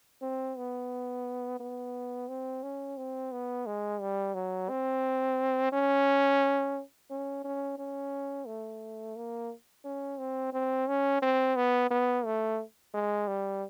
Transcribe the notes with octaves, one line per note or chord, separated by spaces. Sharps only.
C4
B3
B3
C4
C#4
C4
B3
G#3
G3
F#3
C4
C#4
C#4
C#4
C#4
A3
A#3
C#4
C4
C4
C#4
C4
B3
B3
A3
G#3
G3